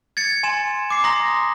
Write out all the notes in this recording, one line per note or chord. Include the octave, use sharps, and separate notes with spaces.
G#6 A6 C#7
G#5 C6 E7
D6 C7
A#5 C6 D#6 A#6